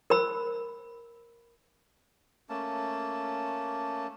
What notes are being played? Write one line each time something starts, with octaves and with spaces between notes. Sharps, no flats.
A#4 C5 B5 E6
A3 A#3 C#4 A5